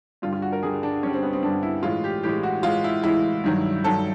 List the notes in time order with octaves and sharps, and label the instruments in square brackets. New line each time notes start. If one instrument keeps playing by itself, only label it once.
[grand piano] G2 D3 G3 F4
F4
F#4
A#4
G2 D3 G3 G#4
D4
G2 D3 G3 C#4
C4
B3
C4
G2 D3 G3 D4
E4
A2 E3 G#3 F4
G4
A2 E3 G#3 G4
F#4
A2 E3 G#3 F4
E4
A2 E3 G#3 E4
G2 D#3 F#3
G2 D#3 F#3 A4